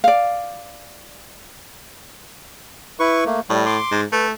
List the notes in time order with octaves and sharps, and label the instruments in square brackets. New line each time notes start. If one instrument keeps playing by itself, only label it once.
[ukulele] D5 F5
[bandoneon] E4 B4 C#6
A3 A#3
[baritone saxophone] A2 [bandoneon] G3
[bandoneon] C6 D6
[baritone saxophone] G#2
[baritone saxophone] A3 [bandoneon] B4